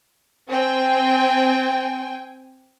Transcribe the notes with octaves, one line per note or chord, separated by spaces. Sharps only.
C4 G5 G#5